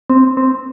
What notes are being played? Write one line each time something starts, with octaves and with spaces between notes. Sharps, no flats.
C4
C4